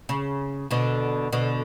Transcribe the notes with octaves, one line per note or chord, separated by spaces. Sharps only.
C#3
B2 D3
B2 D3